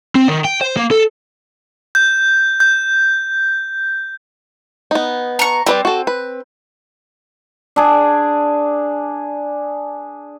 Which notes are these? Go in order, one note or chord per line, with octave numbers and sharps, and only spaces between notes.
C4
D#3
G5
C5
A#3
A4
G6
G6
B3 D#4
A#5 C#6
G3 C4 B4 D5
F#4 A4
B4
D4 G#4